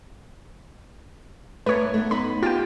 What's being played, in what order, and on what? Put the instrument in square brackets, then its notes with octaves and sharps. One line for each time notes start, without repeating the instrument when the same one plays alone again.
[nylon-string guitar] A3 B3 D#4 [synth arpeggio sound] B4 C#5
[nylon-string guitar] A3 B3
[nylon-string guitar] B3 D#4 [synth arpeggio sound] B5
[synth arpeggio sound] F4 G5 [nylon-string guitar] G4